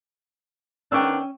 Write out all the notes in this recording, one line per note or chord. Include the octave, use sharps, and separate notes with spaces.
D#3 B3 C#4 D4 G5 C#6 E6